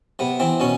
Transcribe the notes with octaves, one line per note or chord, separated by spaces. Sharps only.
C3 B3
E3 C4
B2 C#4